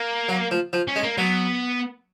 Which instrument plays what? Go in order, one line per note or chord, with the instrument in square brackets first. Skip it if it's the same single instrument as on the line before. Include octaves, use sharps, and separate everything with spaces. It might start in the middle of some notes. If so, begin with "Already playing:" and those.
Already playing: [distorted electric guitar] A#3
[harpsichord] F#3
F3
F3
[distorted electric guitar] C#4
[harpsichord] G#3
[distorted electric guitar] A#3
[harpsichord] F#3 [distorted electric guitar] B3